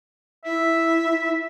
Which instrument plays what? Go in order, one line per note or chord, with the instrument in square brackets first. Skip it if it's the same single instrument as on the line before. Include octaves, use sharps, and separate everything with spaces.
[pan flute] E4 [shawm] E5